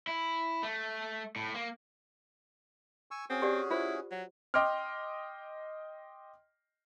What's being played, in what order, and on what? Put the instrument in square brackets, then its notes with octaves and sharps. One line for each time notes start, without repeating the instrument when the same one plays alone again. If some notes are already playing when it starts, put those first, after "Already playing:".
[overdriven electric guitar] E4
A3
A2
A#3
[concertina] G#5 C#6 E6
[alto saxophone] C4 [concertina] C#4 F#4 G#4
[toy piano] G4 D5 F#5
[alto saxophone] E4 [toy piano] F4 C5
[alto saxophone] F#3
[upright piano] D#5 G5 C6 D6 F6